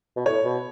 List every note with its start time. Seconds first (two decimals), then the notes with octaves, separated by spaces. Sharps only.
0.16 B2
0.26 A2 C#5
0.44 B2